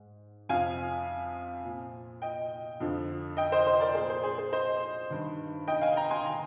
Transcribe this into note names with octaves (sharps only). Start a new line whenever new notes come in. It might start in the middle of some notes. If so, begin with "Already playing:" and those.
Already playing: G#2
F2 C3 F3 F5 G#5
A#2 F3
D#5 G5
F2 D3 F3
D#5 G5
C5 D#5
C5 D#5
A#4 D5
A#2 F3 G#4 C5
G#4 C5
G#4 C5
G#4 C5
C5 D#5
G2 D#3
D#5 G5
F5 G#5
G5 A#5
G#5 C6
D#3 G5 A#5